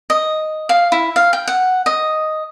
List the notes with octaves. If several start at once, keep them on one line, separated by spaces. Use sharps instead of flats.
D#5
F5
E4
F5
G5
F#5
D#5